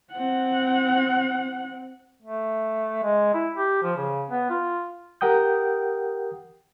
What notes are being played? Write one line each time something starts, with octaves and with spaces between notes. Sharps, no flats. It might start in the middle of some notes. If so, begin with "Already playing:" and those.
C4 F#5
A3
G#3
E4
G4
F3
C#3
B3
F4
G4 A#4 F#5 G5 D#6 G6